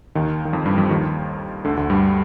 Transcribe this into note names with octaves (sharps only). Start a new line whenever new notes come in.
D#2 D#3
D#3
F2 F3
G2 G3
F2 F3
D#2 D#3
D2 D3
D2 D3
G2 G3